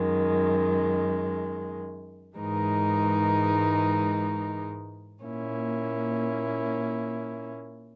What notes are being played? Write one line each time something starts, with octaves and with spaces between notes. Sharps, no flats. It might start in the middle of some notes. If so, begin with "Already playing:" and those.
Already playing: F#2 D#3 G#3
G#2 E3 G#3 D#4 A#4
A#2 A#3 C#4 E4